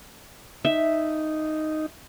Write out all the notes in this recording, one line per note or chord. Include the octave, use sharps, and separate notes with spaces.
D#4 E5